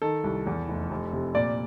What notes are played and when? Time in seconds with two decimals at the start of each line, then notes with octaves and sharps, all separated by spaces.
0.02 D#3 A4
0.24 C2
0.47 E2
0.68 F1
0.91 F1
1.13 C3
1.35 A#2 D5